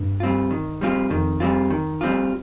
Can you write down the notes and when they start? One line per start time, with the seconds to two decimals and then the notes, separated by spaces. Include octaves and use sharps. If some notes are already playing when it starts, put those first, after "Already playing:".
Already playing: G2
0.20 G3 C4 F4
0.51 D#3
0.81 G3 C4 F4
1.10 F2 D#3
1.40 G3 C4 F4
1.70 D#3
2.01 G3 C4 F4